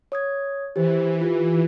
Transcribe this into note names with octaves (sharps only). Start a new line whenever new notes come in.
C#5 D#6 G#6
E3 G4 C5
F4 G4 B4